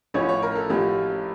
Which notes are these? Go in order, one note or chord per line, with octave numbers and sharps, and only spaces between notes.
A1 A2 F3 C#4 C#5
C#5
A#4
A4
A1 A2 F3 C#4 G4